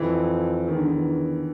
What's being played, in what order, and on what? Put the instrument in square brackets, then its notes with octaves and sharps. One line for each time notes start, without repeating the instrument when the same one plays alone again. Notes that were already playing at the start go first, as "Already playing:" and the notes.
Already playing: [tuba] F2 [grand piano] E3
[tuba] E2 [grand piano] D#3
[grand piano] D3
D#3